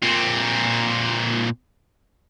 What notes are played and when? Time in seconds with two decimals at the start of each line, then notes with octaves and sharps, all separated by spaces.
0.02 A#2 C4